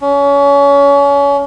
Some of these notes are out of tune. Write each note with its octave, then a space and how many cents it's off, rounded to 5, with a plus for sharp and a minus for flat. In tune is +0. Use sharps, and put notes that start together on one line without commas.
C#4 +30